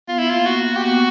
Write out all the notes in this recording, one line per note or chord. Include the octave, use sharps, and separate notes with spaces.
B3 F4
E4
A#3 F4
F#4
A#3
G4
B3 F#4